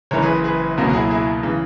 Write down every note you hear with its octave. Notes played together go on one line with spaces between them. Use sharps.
F#1 F#2 E3 A#4 C#5
G#4 B4
G#4 B4
C#2 B2 F#3 A#3 F#4 A#4
F#4
E4 G#4
E4 G#4
C#3 E3